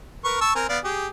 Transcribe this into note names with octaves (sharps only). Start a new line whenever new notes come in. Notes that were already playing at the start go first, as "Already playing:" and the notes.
A#4 B4 C#6
A5 C#6 E6
C4 A#4 G#5
B3 D5 F5
G4 G#4